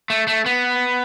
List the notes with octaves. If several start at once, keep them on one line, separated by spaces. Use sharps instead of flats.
A3
A3
B3